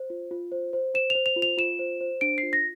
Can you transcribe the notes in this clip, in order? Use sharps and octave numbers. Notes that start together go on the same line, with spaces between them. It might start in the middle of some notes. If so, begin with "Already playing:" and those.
Already playing: C5
F4
F4
C5
C5
C5 E7
F7
C5
F7
F4
F7
F4 E7
C5
C5
D4 D7
C7
F4
A#6